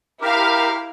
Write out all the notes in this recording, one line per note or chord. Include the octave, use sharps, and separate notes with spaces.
E4 G4 A#4 F5